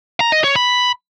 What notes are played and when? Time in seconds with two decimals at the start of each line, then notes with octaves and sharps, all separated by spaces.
0.20 A#5
0.32 D#5
0.44 C#5
0.56 B5